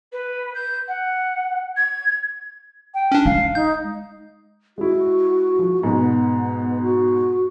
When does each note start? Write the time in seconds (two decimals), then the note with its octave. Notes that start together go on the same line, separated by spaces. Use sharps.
0.12 B4
0.54 G6
0.88 F#5
1.76 G#6
2.94 G5
3.12 C#4 D4
3.26 G#3 F5
3.55 D#4 G6
4.78 G#3 E4 F#4
5.59 F3
5.83 G#2 B2 B3
6.82 F#4